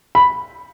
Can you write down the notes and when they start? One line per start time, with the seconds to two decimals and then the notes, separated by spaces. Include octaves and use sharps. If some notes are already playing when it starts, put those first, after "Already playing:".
0.15 B5